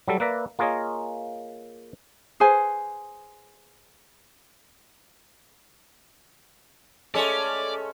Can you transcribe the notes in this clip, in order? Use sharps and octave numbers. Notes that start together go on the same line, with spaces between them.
F#3 G3 A4
A#3 B4 D5 E5 A#5
A#3 F4 G#4 A#4 C#5 D#5
G#4 B4 C5 G#5
G#3 A3 C#4 A4 D5